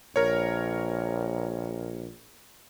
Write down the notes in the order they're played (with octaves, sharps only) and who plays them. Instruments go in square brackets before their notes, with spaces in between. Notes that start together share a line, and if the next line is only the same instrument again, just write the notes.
[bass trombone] A#1 [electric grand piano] A#4 C#5